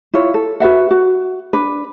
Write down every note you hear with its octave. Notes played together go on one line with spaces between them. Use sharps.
E4 F4 C#5
A4
F#4 B4 E5 F#5
F#4
D4 B4